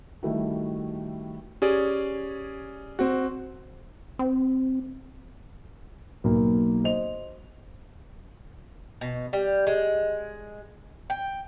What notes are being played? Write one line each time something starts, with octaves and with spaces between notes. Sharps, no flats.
D#3 G3 A3 E4 F#4
C#4 G4 G#4 D5
C4 F#4
C4
B1 A#3
C5 D#5 F7
B2
G3
G#3
G5